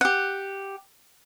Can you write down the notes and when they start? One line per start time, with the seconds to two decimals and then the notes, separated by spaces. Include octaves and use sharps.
0.01 G4 F#5